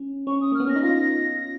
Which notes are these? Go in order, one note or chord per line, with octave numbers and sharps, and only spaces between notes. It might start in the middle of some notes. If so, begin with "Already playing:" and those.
Already playing: C#4
C#4 C#6
D#6
A#3
F6
B3
C#4 A#6
D#4
F4 A#6
A#6